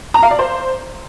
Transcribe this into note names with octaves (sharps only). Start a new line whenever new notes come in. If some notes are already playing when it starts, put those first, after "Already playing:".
A#5
F5
D5
C5